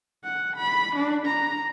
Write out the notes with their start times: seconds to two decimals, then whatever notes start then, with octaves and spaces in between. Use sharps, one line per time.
0.24 F#5
0.56 B5
0.96 D4
1.26 A#5